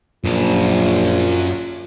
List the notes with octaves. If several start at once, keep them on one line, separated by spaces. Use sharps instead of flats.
A#1 F#2 F4 A5